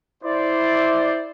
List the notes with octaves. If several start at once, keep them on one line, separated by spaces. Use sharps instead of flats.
E4 C5 D5